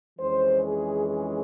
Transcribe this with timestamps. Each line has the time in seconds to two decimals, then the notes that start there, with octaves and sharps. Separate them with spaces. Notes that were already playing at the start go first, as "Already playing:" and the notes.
0.19 F2 E3 G#3 C#4 C5
0.63 G#4
1.07 G#4